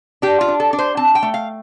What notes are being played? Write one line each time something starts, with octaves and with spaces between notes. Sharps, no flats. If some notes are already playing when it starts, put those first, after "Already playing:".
D4 G4
F4
D4
A4
D4
C5
C4 A5
G5
A3
F5